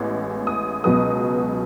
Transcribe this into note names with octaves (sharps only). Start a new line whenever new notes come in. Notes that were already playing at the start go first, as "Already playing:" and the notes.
Already playing: A1 A2 G#3 B3
D#6
C#2 B2 F#3 B3 D#6